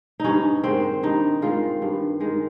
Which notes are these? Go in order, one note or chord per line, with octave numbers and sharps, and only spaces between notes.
G2 C#4 D#4
D#3 G#3 C4
G2 D#4
D#3 G#3 F4
G2
D#3 G#3